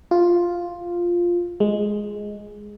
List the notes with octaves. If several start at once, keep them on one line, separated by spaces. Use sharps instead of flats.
F4
G#3